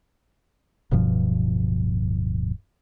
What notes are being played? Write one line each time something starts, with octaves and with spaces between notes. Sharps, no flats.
D1 G2 B2 F3